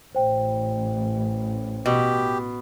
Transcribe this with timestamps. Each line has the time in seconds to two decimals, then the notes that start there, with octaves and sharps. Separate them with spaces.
0.15 A1 C5 G5
1.86 B2 G4